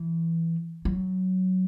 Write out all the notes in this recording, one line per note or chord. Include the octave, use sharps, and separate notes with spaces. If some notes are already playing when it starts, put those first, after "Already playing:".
Already playing: E3
F#3